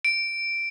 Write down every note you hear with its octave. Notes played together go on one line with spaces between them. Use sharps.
D7